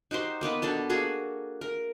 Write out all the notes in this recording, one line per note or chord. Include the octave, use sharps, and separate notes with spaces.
D#4 F#4 G4 C5
A#3 B3 D#4 B4
B2 D4 A4 A5
A#3 F#4 G#4 A4
A#4